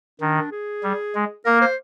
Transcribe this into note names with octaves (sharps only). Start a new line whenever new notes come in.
D#3 D4
G#4
G3
G#3
A#3 A#4
C5